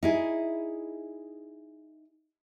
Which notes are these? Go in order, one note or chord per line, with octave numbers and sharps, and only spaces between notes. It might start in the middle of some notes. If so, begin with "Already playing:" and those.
D#4 E4 G#4